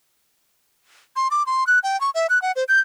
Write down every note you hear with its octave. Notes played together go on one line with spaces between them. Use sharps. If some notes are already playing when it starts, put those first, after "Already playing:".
C6
D6
C6
F#6
G5
C#6
E5
F#6
F#5
C5
G6